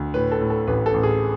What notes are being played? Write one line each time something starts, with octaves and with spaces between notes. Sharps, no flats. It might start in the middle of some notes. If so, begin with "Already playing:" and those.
Already playing: D2
A2 B4
A4
A2
A4
A1 B4
A4
A1
G#4